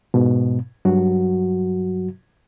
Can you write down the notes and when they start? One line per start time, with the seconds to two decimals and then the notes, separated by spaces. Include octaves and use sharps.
0.14 G#2 B2
0.85 G2 F#3 F#4